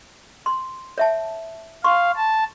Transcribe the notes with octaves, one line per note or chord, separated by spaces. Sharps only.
C6
C#5 E5 A5
F5 C6 C#6
A5